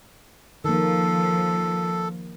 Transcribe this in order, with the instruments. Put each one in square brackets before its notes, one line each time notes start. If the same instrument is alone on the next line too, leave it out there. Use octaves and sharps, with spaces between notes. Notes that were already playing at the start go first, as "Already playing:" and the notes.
[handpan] D#3 A#3 [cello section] F3 [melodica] A4